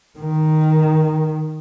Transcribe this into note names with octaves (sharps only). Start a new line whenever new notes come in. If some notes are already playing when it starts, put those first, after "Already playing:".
D#3